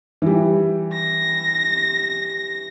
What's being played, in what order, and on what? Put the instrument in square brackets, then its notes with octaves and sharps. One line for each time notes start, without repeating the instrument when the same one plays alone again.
[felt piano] E3 G3
[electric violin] A#6